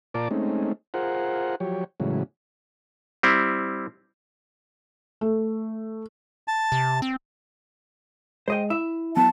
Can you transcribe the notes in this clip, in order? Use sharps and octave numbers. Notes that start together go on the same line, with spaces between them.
A#2 F4 A#4 D5 A5 D6
G#3 A3 C4 C#4 D#4
F4 G#4 A#4 C5 F#5
F3 F#3 G4 C#5
A2 C#3 E3 F#3 G#3
G3 C4 E4
A3
A5
C3
C4
G#3 C5 D#5 G5
E4 E5
F#3 B3 A5